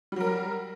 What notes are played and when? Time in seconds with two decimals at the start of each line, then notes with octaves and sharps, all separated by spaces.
0.12 G3
0.16 F#3
0.20 A#4